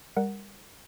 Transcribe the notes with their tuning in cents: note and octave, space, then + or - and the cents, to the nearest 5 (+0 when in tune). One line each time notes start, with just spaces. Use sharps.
G3 +30 A#4 +0 F#5 +0